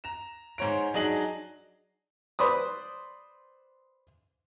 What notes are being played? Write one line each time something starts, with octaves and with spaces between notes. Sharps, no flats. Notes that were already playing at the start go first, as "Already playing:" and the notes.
A#5 E7
G#2 C5 C#5 A#5 D7
F#3 D4 D#4 G#4 F#7
B4 C5 D5 B5 D#6